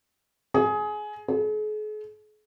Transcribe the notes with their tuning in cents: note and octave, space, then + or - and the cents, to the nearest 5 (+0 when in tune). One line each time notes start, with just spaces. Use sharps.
G#4 +20
G#4 +45